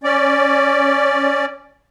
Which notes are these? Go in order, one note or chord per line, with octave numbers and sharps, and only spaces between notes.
C#4 D5